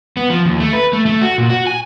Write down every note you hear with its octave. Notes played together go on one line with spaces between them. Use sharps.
B3
F3
D#2
A3
B4
A3
A3
F#4
A#2
F#4
G#5